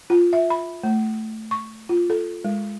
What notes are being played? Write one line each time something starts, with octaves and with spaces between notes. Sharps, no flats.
F4
E5
B5
A3
C#6
F4
A4
G#3